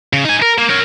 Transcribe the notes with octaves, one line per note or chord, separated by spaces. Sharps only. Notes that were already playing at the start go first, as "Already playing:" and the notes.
C#3
D#4 G#5
A#4
A#3
A#4 C#5